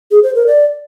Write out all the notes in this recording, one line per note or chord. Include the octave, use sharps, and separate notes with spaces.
G#4
C5
A#4
D5